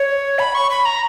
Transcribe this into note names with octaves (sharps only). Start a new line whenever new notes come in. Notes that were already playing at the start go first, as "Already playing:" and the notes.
Already playing: C#5
B5
C#6
B5
A#5